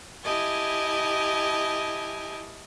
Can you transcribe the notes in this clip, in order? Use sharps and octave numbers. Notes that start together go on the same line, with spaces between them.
E4 G4 D#5 G#5 A5